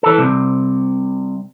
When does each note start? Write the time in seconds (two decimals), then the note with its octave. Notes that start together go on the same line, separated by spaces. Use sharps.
0.03 E3 A4
0.18 C2 C3